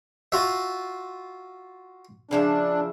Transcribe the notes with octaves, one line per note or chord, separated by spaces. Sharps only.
F4 F#4 E5
C#3 F3 D4 E5